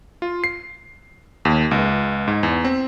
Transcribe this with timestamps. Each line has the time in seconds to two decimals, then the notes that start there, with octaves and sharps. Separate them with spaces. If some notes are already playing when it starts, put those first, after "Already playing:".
0.22 F4
0.44 C7
1.45 D#2
1.71 C#2
2.28 G#2
2.43 E2
2.65 C4